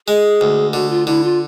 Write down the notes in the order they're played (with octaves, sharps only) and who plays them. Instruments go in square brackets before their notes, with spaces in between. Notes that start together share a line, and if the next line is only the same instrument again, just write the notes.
[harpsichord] G#3 [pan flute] G#4
[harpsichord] D2
[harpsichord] D3 [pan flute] F#4
[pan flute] F4
[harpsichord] D3 [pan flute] E4
[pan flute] F4